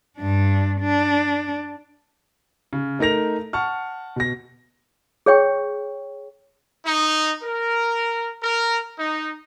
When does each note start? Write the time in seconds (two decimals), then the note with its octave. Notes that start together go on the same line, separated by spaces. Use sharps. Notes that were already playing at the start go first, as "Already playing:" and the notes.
0.19 G2 D4
0.81 D4
2.73 C#3
2.99 A3 D#4 A#4 A#6 F7
3.53 F#5 A5 C#6 F6
4.16 B2 A#6
5.26 G#4 C#5 G5 C#6
6.86 D#4
7.43 A#4
8.43 A#4
8.99 D#4